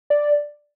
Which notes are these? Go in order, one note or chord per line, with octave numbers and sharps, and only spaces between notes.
D5